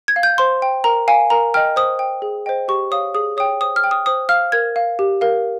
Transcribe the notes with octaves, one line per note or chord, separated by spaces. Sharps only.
G#6
F5
G6
C5 C6
G5
A#4 A#5
F5 G#5
A#4 A#5
D#5 G5 F6
C5 D#6
G5
G#4
C5 D#5 G5
G4 C#6
C#5 F5 D#6
G#4 D#6
C#5 G5 D#6
C5 D#6
F6
G5
D#6
C5 D#6
F5 F6
A#4 G#6
F5
G4
A#4 F5